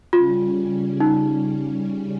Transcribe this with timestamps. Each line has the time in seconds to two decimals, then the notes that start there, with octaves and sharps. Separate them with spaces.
0.12 C#3 G3 C#4 F4
1.00 D#4